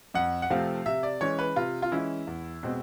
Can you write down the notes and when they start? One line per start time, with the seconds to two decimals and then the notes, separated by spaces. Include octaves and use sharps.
0.14 F2 F#5
0.42 F#5
0.50 C3 F3 A3 C4 F5
0.86 C3 E5
1.03 D5
1.21 E3 G#3 C#4 C#5
1.39 B4
1.56 C3 F4
1.82 F4
1.91 E3 G#3 C#4 E4
2.27 E2
2.63 B2 G#3 C4